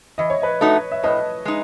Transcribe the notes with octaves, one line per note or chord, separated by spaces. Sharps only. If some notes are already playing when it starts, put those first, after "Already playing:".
E3 D#5
C#5
B4 D#5
A3 D#4 F#4
E5
A2 B4 D#5
G#3 D#4